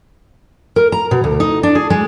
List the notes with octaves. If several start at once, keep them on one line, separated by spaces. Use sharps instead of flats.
A#4
A#5
B2
D2
D#4
D4
G#4
G#3